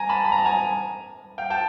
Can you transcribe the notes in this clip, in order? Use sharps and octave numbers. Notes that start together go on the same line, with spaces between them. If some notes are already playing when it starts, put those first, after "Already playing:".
Already playing: G#5 A#5
A5 B5
B5
A#5
A5
G#5 A#5
F5 G5
G5 A5